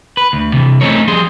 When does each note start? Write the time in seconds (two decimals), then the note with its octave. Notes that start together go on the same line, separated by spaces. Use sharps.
0.17 B4
0.33 D2
0.54 C3 E3
0.81 A3 C4 C#4 D#4 A#4 C#5
1.08 F3 G3 G#4 C6